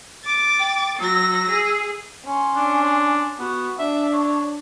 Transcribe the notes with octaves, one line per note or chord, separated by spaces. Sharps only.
D6 A6
G5
F#3 E6 A#6
G#4
C#4 C6
D4
B3 F#4
D4 E5
C#5